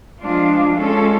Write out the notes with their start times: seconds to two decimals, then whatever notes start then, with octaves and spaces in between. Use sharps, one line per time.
0.20 F3 G#3 D4 F4
0.78 G#3 C#4 F4 A4